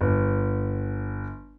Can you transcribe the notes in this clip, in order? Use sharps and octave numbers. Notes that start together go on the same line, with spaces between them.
G1